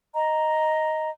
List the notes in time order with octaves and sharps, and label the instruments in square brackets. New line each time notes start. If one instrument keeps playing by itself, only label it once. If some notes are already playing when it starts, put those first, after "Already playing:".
[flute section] D#5 A#5